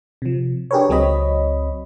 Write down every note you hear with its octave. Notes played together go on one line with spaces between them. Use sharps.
C3 F3
D4 G4 G#4 A#4 B4 C#5
C#2 F#3 C4 C#5 D#5 B5